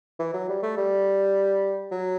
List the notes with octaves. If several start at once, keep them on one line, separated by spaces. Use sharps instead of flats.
E3
F#3
G3
A3
G3
F#3